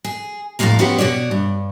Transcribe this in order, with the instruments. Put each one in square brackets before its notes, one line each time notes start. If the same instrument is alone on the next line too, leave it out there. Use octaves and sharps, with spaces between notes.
[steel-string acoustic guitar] G#4
F2 A2 G#3 A#3 F5 A#5
B3 C#4 F#4 G4 C5
B2 F#4 C#5 D5
G2